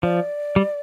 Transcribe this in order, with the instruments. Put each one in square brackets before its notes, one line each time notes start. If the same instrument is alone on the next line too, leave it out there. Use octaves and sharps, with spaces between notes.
[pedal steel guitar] F3 [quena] D5
[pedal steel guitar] G3